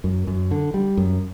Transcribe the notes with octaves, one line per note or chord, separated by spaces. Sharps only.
F#2
F#2
D3
G3
F#2